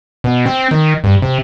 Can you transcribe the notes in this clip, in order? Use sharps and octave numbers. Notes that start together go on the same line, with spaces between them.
B2
C4
D#3
G2
C3